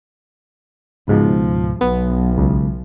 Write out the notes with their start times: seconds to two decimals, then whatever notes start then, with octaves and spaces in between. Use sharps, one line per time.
1.08 C#2 G#2 B2 F3
1.81 B1 B3
2.38 C#2